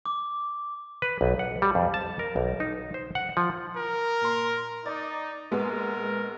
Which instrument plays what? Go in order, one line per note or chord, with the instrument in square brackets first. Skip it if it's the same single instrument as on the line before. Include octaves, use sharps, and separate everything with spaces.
[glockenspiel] D6
[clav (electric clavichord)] B4
B1
F#5
G3
F2
A5
A#4
B1
D#4
C5
F#5
F3
[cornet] A#4
[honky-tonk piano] A#2 C6
[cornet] D#4 [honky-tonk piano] D5
[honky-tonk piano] A#1 G#3 B3 [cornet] A#4